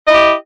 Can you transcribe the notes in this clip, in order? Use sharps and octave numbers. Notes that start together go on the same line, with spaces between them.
E4 G4 D#5